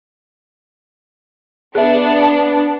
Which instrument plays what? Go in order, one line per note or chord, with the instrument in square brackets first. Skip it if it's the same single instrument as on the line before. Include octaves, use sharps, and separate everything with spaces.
[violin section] B3 D4 [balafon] G#4 E5